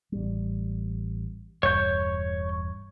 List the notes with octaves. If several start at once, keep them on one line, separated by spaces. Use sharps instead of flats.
A1 G3
E1 G2 C#5 G6